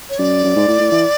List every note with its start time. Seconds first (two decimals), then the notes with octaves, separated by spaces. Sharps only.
0.10 C#5
0.18 F#2 D5
0.44 F#2
0.56 G#2
0.68 A2
0.80 A2
0.92 E3